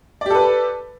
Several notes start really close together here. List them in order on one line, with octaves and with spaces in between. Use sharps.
D5 G4 A4 B4